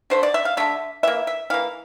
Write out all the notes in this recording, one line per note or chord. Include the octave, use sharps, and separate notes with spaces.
D3 A3 C5
D5
E5
F5
D3 A3 E5
E3 A#3 E5
E5
E3 A#3 F5